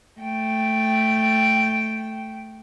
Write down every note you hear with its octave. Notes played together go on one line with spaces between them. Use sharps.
A3 G5